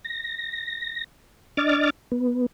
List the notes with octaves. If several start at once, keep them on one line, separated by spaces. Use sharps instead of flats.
A#6
D4 D#5 D6 F6 A6
B3